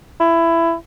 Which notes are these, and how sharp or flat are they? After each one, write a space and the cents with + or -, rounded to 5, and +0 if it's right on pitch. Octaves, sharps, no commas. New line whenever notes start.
E4 +15